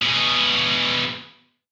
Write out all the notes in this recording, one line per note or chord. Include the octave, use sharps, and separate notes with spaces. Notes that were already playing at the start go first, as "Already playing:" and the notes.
B2 G#4